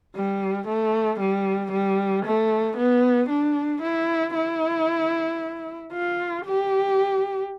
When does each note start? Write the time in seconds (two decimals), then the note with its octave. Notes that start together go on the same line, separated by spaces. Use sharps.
0.15 G3
0.67 A3
1.20 G3
1.72 G3
2.25 A3
2.77 B3
3.30 D4
3.82 E4
4.35 E4
5.92 F4
6.45 G4